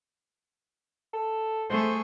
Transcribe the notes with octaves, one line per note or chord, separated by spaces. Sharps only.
A4
A3 G#4 C5